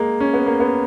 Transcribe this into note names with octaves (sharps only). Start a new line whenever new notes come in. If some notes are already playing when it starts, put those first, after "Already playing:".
Already playing: G#3 A#3
C#4
B3
A#3
B3